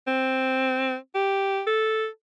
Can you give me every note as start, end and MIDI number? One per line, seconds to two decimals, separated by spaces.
0.08 0.96 60
1.15 1.62 67
1.67 2.07 69